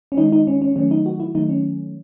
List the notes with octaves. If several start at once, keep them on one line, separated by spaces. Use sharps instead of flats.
C#4
D#3 G#3 D#4
D#4
C#4
C#4
D#3 F#3 A3 C#4
D#4
F#4
E4
D#3 F#3 A3 D#4
C#4